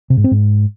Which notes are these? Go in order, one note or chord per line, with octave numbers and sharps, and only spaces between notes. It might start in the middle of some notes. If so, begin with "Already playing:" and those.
C3
G#2
C4
G#2